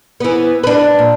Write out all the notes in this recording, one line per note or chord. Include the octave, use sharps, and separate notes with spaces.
E3 B3
D4 B4
A#2